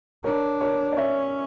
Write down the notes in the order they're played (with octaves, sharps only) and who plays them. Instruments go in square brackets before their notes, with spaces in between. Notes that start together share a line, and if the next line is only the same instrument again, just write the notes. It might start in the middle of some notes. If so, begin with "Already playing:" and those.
[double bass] D4 [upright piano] A#4 C#5
[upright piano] A#4 C#5
D5
[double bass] C#4 [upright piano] C#5 E5